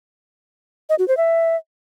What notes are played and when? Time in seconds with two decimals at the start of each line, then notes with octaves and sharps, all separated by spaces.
0.89 D#5
0.99 F#4
1.08 C5
1.17 E5